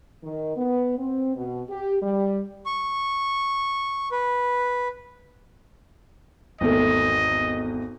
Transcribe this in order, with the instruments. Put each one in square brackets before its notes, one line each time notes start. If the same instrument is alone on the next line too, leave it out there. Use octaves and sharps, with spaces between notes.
[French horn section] D#3
B3
C4
B2
G4
G3
[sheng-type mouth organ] C#6
B4
[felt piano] G#1 E2 A3 [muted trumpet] D#5